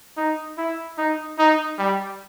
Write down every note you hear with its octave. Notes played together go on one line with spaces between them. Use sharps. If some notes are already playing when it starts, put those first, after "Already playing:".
D#4
E4
D#4
D#4
G3